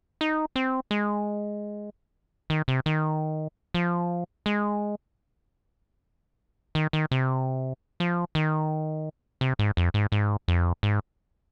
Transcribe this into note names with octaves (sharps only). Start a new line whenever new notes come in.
D#4
C4
G#3
D#3
C3
D#3
F3
G#3
D#3
D#3
C3
F3
D#3
C3
G#2
F2
G#2
G#2
F2
G#2